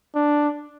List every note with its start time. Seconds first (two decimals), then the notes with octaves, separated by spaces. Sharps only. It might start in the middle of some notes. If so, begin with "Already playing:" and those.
0.15 D4